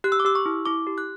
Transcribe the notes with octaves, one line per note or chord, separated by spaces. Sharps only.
G4 F#6
E6
D6
G4 E6
C#6
E4
E4 D6
G4
F#6